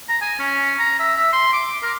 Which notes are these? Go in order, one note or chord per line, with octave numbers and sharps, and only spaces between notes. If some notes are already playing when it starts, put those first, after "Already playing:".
A#5
G#5
C#4
A#5
E5
E5
C6
D6
A#4